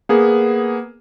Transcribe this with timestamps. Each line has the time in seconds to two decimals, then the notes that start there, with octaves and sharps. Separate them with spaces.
0.09 A#3 B3 G#4